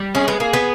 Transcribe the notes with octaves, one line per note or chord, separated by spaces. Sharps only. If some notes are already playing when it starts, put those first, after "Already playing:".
Already playing: G3
C#4 G#4
B3
A#3 G#4
B3